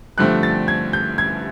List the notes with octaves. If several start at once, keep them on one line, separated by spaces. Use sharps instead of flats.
G2 D3 F3 A3 C4 F#6
A6
G#6
G6
G#6